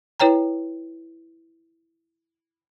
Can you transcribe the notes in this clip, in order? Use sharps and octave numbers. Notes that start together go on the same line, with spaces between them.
E4 B4 C#5 G5 A#5